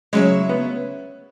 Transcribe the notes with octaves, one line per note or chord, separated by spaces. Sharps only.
C#3 F#3 G#3 E4 C#5 E5
B3